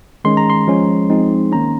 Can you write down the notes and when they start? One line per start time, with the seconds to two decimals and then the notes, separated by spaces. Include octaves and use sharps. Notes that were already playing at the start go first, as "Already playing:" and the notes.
0.25 D#3 G#3 C#4 C6
0.37 A#5
0.50 C6
0.67 F3 G#3 C#4
1.10 F3 G#3 C4 D#4
1.52 D#3 A#3 C#4 A#5